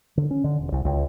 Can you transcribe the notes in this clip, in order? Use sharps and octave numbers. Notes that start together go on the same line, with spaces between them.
D3
C#4
D3
E1
C2
C#2